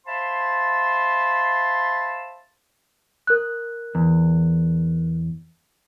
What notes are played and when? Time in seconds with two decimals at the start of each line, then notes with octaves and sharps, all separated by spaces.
0.07 C5 E5 F5 A5 B5 C6
3.27 A#4 F#6
3.95 E2